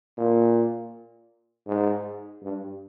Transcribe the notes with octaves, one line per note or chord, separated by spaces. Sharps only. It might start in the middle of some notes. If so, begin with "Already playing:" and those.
A#2
G#2
G2